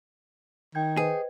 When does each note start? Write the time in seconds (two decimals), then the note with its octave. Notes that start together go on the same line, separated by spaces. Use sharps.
0.75 D#3 G5 G6 G#6
0.97 G#4 B4 C5 D#5